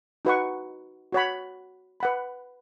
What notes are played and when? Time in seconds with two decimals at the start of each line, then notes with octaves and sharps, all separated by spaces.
0.25 D#4 F#4 B4 F#5 C#6
1.12 F#4 C#5 F#5 B5
2.00 B4 F#5 B5